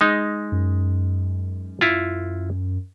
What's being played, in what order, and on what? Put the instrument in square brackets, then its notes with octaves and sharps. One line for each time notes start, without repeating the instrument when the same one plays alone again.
[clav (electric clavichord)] G#3 D#4
[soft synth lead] F#2
[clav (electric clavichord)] E4 F4